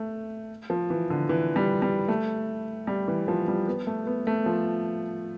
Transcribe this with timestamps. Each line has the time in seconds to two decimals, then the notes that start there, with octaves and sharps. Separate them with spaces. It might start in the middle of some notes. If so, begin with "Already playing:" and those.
Already playing: A3
0.70 F3
0.90 E3
1.10 D3
1.29 E3
1.56 G3
1.82 G3
2.08 A3
2.87 G3
3.08 E3
3.28 F3
3.48 G3
3.67 B3
3.87 A3
4.07 B3
4.27 A3
4.46 F3